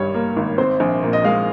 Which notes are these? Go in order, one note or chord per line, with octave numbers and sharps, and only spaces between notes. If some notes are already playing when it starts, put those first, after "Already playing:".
Already playing: G#1 G2 G3 C#5
A#3
G#1
C4 C5
A#1
A#2
D#5
G#3 F5